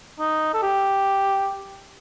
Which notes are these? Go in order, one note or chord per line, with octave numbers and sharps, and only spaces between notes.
D#4
A4
G4